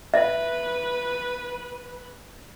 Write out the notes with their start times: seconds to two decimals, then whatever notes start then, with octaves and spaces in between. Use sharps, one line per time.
0.14 B4 E5